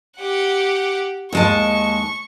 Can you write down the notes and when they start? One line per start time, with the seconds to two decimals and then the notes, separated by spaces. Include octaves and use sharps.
0.17 G4 F#5
1.33 D#2 G#3 A5 C#6